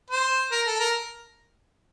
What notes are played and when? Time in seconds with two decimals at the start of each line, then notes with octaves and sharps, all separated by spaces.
0.10 C5
0.52 A#4
0.67 A4
0.80 A#4